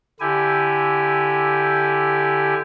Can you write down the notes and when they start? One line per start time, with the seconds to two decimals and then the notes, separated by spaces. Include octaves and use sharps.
0.20 D3 E4 G4 G#5